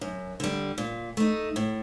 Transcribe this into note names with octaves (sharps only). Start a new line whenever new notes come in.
F#2
D3 G3
A#2
A3 D#4
A2